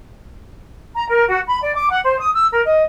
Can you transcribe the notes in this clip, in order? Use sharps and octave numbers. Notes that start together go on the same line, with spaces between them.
A#5
A#4
F#4
B5
D5
D6
F#5
C5
D#6
E6
A#4
D#5